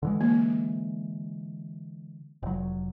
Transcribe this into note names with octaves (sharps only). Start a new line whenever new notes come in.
D3 E3 G#3
A#3
F1 F#3